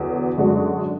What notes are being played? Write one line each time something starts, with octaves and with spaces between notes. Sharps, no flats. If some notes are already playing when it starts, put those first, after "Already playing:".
Already playing: E2 D3 F#3
F#2 D3 G#3 D4 F#4